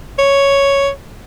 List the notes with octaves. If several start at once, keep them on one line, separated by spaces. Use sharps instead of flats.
C#5